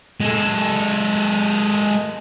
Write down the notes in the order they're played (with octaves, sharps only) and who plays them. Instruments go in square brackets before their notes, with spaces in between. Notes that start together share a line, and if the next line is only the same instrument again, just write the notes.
[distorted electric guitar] G#3 A4